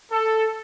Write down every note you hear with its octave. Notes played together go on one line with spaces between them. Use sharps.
A4